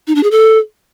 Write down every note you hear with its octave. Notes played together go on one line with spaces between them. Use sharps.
D#4
D4
G#4
A4